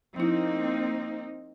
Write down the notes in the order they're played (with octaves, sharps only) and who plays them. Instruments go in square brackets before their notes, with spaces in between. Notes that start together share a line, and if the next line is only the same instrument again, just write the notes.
[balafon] F3 E4 [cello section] A#3 C4 D#4